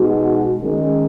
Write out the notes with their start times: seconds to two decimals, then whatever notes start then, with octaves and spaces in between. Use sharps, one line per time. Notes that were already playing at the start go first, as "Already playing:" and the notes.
Already playing: B2 G#3 D#4 F#4
0.60 D#3 G#3 C#4